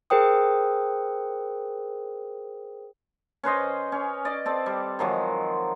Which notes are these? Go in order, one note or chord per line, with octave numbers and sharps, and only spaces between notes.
G#4 A#4 C5 G5 D#6
C#4 B4 C5 D#5
C#4
D5 D#5
C4 A4 D5
G3
D#3 F3 F#3 G#3